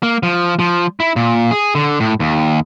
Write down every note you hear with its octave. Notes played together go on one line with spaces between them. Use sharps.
A#3
F3
F3
E4
A#2
G#4
D3
A2
D#2